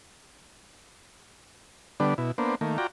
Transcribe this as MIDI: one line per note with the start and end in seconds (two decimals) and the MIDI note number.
2.00 2.14 50
2.00 2.14 55
2.00 2.14 59
2.00 2.14 62
2.18 2.32 47
2.18 2.32 64
2.38 2.55 58
2.38 2.55 59
2.38 2.55 62
2.38 2.55 72
2.61 2.78 51
2.61 2.78 57
2.61 2.78 58
2.78 2.87 65
2.78 2.87 66
2.78 2.87 74
2.78 2.87 79
2.78 2.87 82